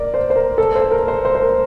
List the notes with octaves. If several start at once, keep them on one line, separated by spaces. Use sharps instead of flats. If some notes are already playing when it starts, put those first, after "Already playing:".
Already playing: A#4 D5
C5
C5
A#4
A4
C5
A#4
C5
C5
C5
A#4